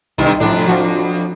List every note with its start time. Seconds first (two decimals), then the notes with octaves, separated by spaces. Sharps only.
0.18 C2 G2 D#3
0.40 F2 A2 D4
0.67 F3 F#4